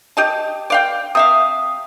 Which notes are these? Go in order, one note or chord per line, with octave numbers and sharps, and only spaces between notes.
G4 D#5 A5
D5 F5 G5
C3 E5 F5 D#6